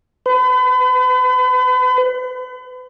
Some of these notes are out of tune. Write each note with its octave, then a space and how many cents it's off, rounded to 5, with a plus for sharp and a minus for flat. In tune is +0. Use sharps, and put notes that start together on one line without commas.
B4 +40